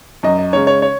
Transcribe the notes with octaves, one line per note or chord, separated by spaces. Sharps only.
F#2 D#5
D#5
C#3 G#3 C#5
C#5
C#5